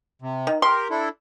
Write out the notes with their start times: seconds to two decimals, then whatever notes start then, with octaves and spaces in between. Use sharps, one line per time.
0.22 C3
0.47 D#3
0.62 G4 A#4 C6
0.90 D4 E4 A4